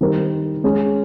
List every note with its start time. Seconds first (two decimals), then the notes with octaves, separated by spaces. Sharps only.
0.01 D#3 G3 C4 D#4 A#4
0.64 G#3 C#4 G#4